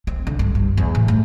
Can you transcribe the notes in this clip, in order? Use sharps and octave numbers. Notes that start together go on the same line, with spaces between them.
C4
D3
G2
G2
E2
A2
A3